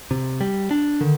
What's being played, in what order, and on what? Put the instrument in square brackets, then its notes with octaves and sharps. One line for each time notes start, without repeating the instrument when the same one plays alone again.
[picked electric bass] C3
G3
D4
[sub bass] D3 [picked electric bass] D#3